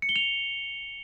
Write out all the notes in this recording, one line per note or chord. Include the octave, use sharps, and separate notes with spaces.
C#7
G7
F7